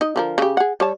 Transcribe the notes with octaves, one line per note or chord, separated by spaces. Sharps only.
D#4 D#5
D3 F3 A#4
C#3 G4
G#4 F#5
G3 C#5 A5